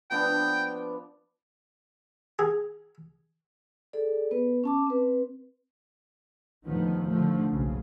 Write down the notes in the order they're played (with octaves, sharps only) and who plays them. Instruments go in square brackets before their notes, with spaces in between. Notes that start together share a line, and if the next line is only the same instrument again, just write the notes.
[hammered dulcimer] F3 B3 D4 [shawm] G5
[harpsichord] G#4
[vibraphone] G#4 A4 D5
B3 B4
C#4 A5 D6
C4 B4
[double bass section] D#2 A2 D3 D#3 F3 B3
D3 F3 A3
F#1 B1 C#3